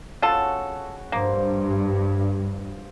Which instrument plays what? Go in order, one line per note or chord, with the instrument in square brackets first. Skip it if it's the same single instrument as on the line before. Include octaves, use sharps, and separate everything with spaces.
[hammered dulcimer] C#3 F#4 F#5 [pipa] F4 A4
[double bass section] G2 [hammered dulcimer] F3 C5 [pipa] A#3